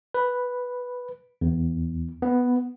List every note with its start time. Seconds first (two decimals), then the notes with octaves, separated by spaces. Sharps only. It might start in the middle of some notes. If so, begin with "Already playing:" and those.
0.14 B4
1.41 E2
2.22 B3